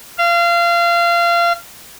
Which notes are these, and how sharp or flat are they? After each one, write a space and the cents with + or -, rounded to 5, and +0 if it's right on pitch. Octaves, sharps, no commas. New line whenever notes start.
F5 -25